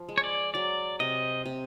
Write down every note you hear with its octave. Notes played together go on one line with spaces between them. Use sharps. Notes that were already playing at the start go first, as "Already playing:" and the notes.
Already playing: F3
G#3
C#5
D5
F#3 D5
C3 D#5
C3